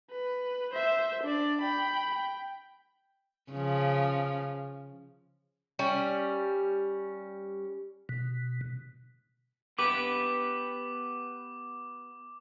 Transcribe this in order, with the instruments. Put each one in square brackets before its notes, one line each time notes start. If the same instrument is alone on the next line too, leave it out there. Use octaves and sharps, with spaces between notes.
[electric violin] B4
C5 E5
D4 D5
G5 B5
G5
[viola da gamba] C#3 F3
[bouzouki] G3 C#4
[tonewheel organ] B2
[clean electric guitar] B3 G4 B4 [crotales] D6